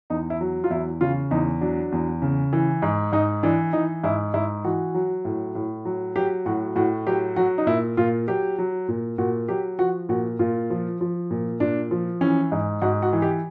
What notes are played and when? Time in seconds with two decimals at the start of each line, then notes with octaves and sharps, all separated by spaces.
0.10 E2 D#4
0.30 E4
0.41 F#3
0.64 F4
0.70 E2 E4
1.01 C#3 F4
1.31 E2 D#4
1.61 F#3 D4
1.92 E2
2.22 C#3
2.53 E3
2.82 G#2
3.12 G#2 D#4
3.43 E3 D4
3.73 E3 D#4
4.04 G#2 E4
4.34 G#2 E4
4.64 E3 F#4
4.95 F#3
5.25 A2
5.55 A2
5.85 F#3
6.16 F#3 G4
6.46 A2 F#4
6.76 A2 F#4
7.07 F#3 G4
7.36 F#3 F#4
7.58 D#4
7.67 A#2 E4
7.97 A#2 F4
8.28 F#3 G4
8.58 F#3
8.88 A#2
9.18 A#2 F#4
9.48 F#3 G4
9.79 F3 F#4
10.09 A#2 F#4
10.39 A#2 F4
10.70 F3
11.01 F3
11.31 A#2
11.60 A#2 D4
11.91 F3
12.21 E3 C#4
12.52 G#2
12.82 G#2 F#4
13.02 F#4
13.13 E3
13.22 G4